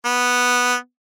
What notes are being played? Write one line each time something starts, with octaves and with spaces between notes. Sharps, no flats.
B3